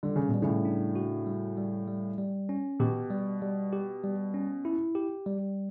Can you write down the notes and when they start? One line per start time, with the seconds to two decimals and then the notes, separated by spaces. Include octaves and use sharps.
0.03 D3 G3
0.16 C#3
0.29 B2
0.34 G3
0.42 A2 C#3
0.65 D4
0.96 F#4
1.27 G3
1.58 G3
1.88 G3
2.18 G3
2.49 C#4
2.80 B2 G4
3.10 G3
3.42 G3
3.73 G4
4.04 G3
4.34 C#4
4.65 E4
4.95 G4
5.26 G3